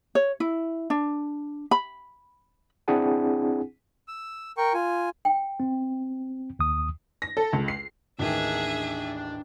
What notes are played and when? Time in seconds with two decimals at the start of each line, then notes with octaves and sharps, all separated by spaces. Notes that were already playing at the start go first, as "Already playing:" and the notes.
0.15 C#5
0.40 E4
0.90 D4
1.71 B5
2.88 C4 D4 E4 G#4 F#5 G#5
4.08 E6
4.57 A#4 G5 C#6
4.74 F4 G#5
5.25 G5
5.60 C4
6.59 D#2 D#6
7.22 A#6
7.37 A4
7.53 C#2
7.68 C7
8.19 A1 D#2 D#3 D4 G#4 E5 A5